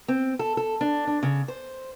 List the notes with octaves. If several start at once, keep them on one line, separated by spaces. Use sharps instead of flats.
C4
A4
A4
D4
D4
C#3
C5